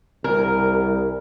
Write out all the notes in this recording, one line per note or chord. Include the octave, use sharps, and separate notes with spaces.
C2 A#4